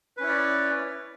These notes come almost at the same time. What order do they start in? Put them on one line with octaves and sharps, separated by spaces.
B4 C#4 E4 C#5 D5